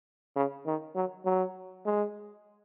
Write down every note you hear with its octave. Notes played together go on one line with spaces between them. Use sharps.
C#3
D#3
F#3
F#3
G#3